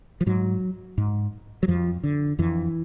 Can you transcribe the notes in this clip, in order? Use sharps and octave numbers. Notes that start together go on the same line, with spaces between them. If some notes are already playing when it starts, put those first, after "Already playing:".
F3
G#2 F#3
G#2
F#3
F2 F3
D3
F2 E3